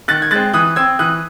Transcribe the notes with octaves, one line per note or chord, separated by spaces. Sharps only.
D#3 F#6 A6
G#6
G#3 C4 F#6 A6
E3 D#6 F#6
C4 E6 G#6
E3 D#6 F#6